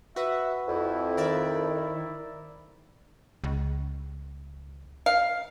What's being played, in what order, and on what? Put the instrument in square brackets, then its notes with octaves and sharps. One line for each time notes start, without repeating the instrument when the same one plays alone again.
[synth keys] F#4 B4 [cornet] E5
[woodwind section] F2 [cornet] E4
[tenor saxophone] D#3 [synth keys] A#4 D5 E5
[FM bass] C#2
[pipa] F5